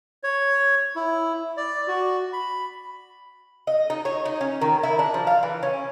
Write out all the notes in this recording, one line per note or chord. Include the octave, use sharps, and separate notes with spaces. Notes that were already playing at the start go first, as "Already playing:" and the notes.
C#5
E4
D5
F#4
B5
D#5
D#4
C#5
D#4
C#4
D#3
E4
D4
F3
F5
E3
C#4